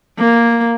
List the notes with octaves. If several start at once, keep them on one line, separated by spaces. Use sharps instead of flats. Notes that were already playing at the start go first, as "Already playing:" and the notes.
A#3